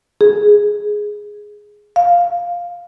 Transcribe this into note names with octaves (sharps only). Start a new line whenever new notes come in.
G#4
F5